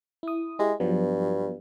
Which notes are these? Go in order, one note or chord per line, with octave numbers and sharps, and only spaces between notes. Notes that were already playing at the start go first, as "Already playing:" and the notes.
E4 D#6
G#3 E4 G4
G2 F3 F#3 B3